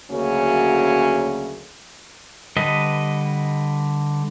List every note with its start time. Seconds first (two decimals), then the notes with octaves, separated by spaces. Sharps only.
0.10 D2 C#3 F#3 A#3 C#4
2.56 D3 G3 B4 D#5